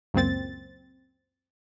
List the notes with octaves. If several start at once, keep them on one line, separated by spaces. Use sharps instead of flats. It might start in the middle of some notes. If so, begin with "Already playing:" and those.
C#2 F#2 A#2 C4 A6